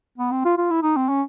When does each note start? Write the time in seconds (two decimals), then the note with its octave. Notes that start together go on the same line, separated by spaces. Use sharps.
0.18 B3
0.31 C4
0.45 F4
0.57 F4
0.70 E4
0.82 D#4
0.96 C4
1.08 C#4